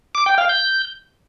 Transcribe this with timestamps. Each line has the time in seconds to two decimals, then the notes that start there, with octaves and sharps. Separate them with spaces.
0.15 D6
0.26 G5
0.38 F5
0.49 G6